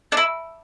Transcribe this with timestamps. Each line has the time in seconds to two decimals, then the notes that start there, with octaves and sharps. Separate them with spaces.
0.12 D4
0.17 E4